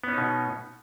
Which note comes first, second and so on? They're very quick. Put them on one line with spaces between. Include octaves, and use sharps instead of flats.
B3 C#4 D#4 B2